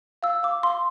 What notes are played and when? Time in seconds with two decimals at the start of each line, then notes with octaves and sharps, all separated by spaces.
0.23 F5 E6
0.43 F5 D6
0.63 F5 C6